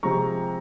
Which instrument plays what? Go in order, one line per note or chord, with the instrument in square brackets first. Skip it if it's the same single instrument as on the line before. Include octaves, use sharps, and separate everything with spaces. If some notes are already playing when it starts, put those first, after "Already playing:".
[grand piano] C3 F3 G#3 A#5 C#6